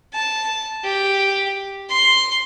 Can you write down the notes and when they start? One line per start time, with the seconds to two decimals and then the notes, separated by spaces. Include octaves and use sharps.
0.13 A5
0.84 G4
1.89 C6